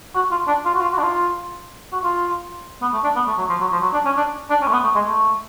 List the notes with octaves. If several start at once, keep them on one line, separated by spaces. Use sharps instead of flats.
F#4
F4
D4
F4
F#4
F4
F#4
D4
F4
F#4
F4
B3
A3
D4
B3
A3
F#3
F3
F#3
F3
F#3
D4
C#4
D4
D4
C#4
A3
B3
A3
G#3
A3